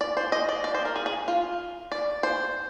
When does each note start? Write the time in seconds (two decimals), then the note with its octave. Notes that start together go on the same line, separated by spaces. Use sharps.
0.01 D5
0.17 C5
0.32 D#5
0.49 D5
0.64 D5
0.74 C5
0.85 A#4
0.96 G#4
1.06 G#4
1.28 F4
1.92 D5
2.23 C5